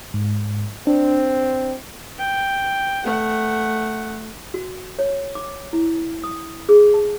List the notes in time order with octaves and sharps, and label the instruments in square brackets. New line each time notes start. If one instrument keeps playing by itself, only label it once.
[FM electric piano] G#2
[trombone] C4 [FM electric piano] D4
[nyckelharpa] G5
A3 F#5
[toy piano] F#4
C#5
D6
E4
D#6
G#4
A5